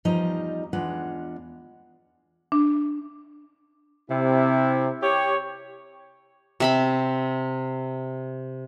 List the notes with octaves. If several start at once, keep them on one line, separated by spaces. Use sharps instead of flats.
E2 F3 G3 D#4 D#5 A#5
E2 G#3 D4 F4 F#5
D4
C3 E4
G4 C#5
C3 E5 B5